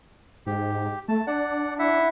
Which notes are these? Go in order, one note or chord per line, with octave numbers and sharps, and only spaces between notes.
G#2 G4
A3 A5
D4 D5 F#5
E4 E5 F#5